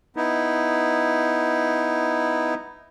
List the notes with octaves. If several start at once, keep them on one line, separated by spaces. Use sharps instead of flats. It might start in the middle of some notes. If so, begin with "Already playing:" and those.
B3 D#4 E4